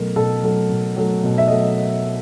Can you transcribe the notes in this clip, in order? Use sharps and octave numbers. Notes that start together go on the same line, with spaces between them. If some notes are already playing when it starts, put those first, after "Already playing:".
Already playing: B2 F#3 A3 A#4
B2 A4
F#3 A3
B2
F#3 A3
B2
E5
F#3 A3 D#5